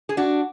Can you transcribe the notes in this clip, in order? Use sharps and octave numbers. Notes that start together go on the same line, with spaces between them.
G#4
D4 F#4